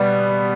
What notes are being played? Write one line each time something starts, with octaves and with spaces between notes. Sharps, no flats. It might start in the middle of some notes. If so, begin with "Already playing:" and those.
Already playing: B2 G3 B3